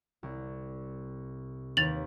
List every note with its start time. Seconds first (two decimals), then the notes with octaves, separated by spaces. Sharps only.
0.23 C2
1.77 D#2 B4 A6 F7 F#7